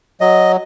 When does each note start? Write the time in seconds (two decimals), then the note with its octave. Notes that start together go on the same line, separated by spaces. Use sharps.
0.21 F#3 D#5